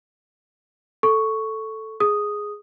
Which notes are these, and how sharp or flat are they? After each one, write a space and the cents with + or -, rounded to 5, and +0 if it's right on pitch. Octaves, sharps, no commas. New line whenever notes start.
A4 +0 C#6 +5
G#4 +0 D#6 -5